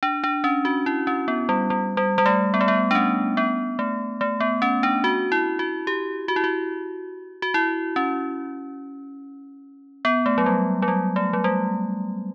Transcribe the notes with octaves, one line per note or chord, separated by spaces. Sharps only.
D4
D4
C#4
F#4
E4
C#4
B3
G3
G3
G3
G3
A3
B3
A3
B3
D4
C#4
B3
A3
A3
B3
C#4
D4
F#4
E4
F#4
G4
F#4
E4
F#4
F#4
E4
C#4
B3
A3
F#3
G3
F#3
G3
A3
F#3
G3